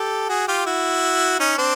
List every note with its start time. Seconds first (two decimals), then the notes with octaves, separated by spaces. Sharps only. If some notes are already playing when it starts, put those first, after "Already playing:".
Already playing: G4 A4
0.29 F#4 G#4
0.48 F4 G4
0.66 E4 F#4
1.40 C#4 D#4
1.58 C4 D4